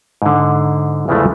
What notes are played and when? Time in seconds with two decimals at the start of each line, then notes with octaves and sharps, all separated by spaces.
0.22 G#2 D3
1.08 E2 C#3 E3 F3 G#3 A3